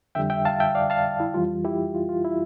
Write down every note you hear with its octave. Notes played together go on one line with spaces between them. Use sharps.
F2 D3 G3 E5 G5
E5 G5
F5 A5
E5 G5
D5 F5
F5 A5
E4
F2 E3 G3 F4
E4 G4
F4
F4
E4